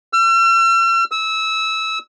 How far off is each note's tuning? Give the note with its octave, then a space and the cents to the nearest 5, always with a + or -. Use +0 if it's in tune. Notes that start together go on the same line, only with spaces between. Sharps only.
E6 +45
E6 -20